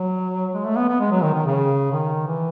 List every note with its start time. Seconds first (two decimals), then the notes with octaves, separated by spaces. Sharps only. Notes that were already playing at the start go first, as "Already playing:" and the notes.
Already playing: F#3
0.53 G#3
0.65 A3
0.76 B3
0.89 B3
1.00 G#3
1.11 F#3
1.23 D#3
1.35 D#3
1.46 C#3
1.92 D#3
2.27 E3